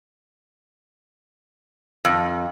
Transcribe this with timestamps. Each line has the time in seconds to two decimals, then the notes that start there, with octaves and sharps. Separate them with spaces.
2.05 F2